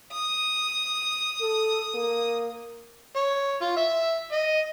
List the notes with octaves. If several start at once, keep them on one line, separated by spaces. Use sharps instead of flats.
D#6
A4
A#3
C#5
F4
E5
D#5